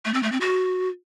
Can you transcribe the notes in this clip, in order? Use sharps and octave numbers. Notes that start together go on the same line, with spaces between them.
A3
C4
A3
C4
F#4